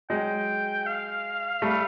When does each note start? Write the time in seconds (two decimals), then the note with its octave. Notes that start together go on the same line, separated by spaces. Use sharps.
0.10 F#3 G#3 G5
0.86 F5
1.62 G3 A3